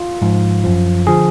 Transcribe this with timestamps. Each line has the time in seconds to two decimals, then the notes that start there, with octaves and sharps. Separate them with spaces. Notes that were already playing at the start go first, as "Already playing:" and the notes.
Already playing: F4
0.22 G#2 F3
0.64 F#2 F3
1.07 D3 F3 G#4